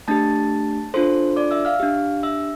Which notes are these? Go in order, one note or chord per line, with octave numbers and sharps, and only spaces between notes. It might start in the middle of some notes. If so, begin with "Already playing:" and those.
A3 D4 G4 A5 A6
D4 F4 A4 C5 C6
D5 D6
E5 E6
F5 F6
D4 G4
E5 E6